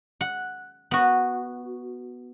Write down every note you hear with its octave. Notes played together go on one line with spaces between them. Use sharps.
F#5
B3 F#4